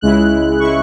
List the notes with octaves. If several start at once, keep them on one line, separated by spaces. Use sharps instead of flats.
C#2 C#3 G#3 E4 F#6
C#3 G#3 E4 C#6